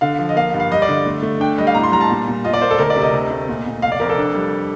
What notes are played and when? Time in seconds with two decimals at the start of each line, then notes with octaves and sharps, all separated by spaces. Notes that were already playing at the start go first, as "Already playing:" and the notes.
0.01 D3 F5
0.19 F3
0.29 D#5
0.36 A#3 F5
0.54 G2
0.60 F5
0.71 G3 D#5
0.82 D5
0.89 D3
1.06 A3
1.22 A3
1.40 D4 G5
1.58 G3 D#5
1.67 F5
1.74 A2 A#5
1.83 C6
1.92 G3 A#5
2.01 A5
2.10 A#2
2.28 A#2
2.44 F4 D#5
2.54 D5
2.61 A#3 C5
2.71 A4
2.78 D2 A#4
2.90 D5
2.97 C3
3.02 D#5
3.13 D2
3.31 A3
3.48 A#2
3.66 A#2
3.82 F1 F5
3.92 D5
4.00 F2 A#4
4.09 A4
4.18 D4
4.35 G3